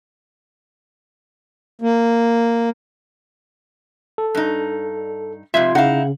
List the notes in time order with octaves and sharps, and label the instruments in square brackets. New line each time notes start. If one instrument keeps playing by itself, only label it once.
[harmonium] A#3
[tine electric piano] A4
[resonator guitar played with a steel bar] G2 D#4
[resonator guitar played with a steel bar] F2 G#2 C3 [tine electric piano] F4 C6 G#6 [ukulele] E5
[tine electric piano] C#3 [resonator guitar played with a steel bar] D#4 E4 [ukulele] F5 F#5